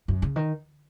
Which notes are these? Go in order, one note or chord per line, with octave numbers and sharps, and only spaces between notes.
F#2
C#3
D#3